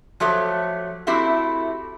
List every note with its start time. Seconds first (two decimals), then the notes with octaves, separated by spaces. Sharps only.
0.20 F3 F#3 A3 G4
1.07 A3 C4 E4 F#4 G4